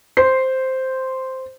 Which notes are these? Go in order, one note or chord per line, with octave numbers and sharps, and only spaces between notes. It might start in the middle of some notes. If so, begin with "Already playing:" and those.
C5 C7